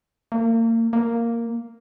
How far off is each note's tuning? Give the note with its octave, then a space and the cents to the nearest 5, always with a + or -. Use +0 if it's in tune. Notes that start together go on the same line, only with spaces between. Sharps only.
A#3 -35
A#3 -5